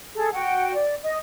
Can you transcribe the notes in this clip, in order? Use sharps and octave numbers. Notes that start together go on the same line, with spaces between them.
G#4 A4
F#4 F#5 G5
D5
D#5